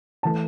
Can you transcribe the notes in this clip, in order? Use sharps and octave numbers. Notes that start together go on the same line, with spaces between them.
E3 A3 A5